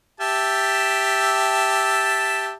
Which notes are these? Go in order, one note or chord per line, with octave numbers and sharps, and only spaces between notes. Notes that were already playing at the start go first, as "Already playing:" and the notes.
G4 E5 A5